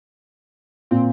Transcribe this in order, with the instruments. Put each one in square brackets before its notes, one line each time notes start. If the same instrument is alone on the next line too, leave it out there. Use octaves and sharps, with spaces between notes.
[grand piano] A#2 [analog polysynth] C4